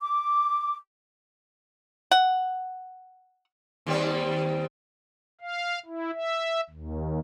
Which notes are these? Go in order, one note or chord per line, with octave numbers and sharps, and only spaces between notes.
D6
F#5
D#2 G3 C4
F5
E4
E5
D#2